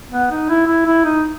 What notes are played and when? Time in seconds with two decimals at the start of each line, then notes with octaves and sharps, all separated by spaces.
0.11 B3
0.31 D#4
0.49 E4
0.67 E4
0.86 E4
1.04 D#4